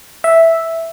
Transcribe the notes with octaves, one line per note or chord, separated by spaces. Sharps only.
E5